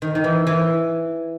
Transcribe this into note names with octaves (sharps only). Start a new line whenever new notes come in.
D#3
D#3
E3
E3